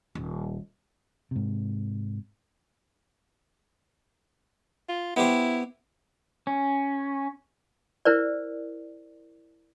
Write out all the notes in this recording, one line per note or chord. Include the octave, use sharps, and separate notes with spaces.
D#1
G#2 C3
F4
B3 E4 G4 C5
C#4
E4 A#4 C5 D5